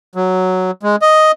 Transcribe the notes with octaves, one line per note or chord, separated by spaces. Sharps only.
F#3
G#3
D#5